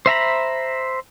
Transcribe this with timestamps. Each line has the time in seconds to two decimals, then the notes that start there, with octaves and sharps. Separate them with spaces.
0.06 C5 E5 A#5 B5